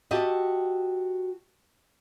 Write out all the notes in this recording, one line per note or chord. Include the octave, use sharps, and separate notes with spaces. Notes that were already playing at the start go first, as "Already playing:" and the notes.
F#4 G4 D#5 E5 A5